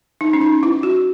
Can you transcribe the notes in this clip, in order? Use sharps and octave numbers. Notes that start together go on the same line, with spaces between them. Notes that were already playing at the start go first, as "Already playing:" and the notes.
D#4
C#4
D#4
E4
F#4